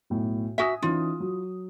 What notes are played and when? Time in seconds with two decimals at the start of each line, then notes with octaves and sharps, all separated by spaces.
0.10 B1 A2
0.58 F#4 E5 G#5 D#6
0.82 E3 C#4 D#4 F4
1.20 F#3